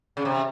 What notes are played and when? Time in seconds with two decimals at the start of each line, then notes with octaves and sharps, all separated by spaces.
0.17 C#3
0.25 C3